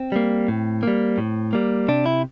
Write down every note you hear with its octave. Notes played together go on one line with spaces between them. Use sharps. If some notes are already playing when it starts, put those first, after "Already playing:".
Already playing: C4
G3 A#3
A2
G3 A#3
A2
G3 A#3
C3 D4
E4